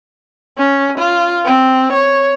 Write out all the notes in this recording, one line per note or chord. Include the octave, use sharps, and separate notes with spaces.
C#4
F4
C4
C#5